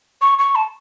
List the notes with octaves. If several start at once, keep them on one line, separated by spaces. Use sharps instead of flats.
C#6
C#6
A5